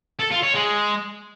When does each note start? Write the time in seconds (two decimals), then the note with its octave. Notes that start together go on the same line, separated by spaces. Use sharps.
0.19 A4
0.31 F4
0.43 C#5
0.54 G#3